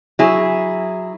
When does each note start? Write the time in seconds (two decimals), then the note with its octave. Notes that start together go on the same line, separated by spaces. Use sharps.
0.19 F#3 E4 G#4